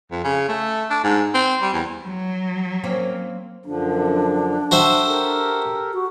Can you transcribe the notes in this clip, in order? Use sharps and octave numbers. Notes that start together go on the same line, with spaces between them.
F2
C#3
A3
D4
G#2
C4
G3
E2
F#3
A#3 C4 C#4
F#2 D3 F3 D4
F#4 A4 C5 E5 G5
G4 A4 A#4
F#4